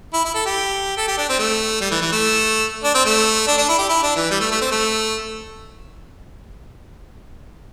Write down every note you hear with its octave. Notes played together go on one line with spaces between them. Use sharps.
E4
E4
A4
G4
A4
G4
D4
C4
A3
G3
E3
E3
A3
D4
C4
A3
D4
D4
E4
G4
E4
D4
E3
G3
A3
A3
C4
A3